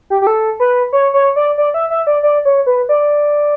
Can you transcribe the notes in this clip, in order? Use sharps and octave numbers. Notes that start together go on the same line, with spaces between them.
G4
G4
A4
B4
C#5
C#5
D5
D5
E5
E5
D5
D5
C#5
B4
D5